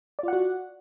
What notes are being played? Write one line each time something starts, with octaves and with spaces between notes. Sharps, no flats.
F4 F#4 D5 F#5